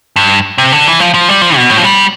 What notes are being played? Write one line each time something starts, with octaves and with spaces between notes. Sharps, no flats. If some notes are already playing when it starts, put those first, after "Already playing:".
G2
C3
D3
E3
F3
F3
G3
F3
B2
A2
F3
G3